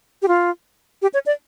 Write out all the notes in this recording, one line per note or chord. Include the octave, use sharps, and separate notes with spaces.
G4
F4
G4
C#5
D5